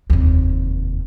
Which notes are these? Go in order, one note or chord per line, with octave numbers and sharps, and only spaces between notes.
F1 D#2